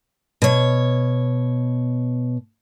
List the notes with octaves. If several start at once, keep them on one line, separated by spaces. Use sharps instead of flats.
B2 C#5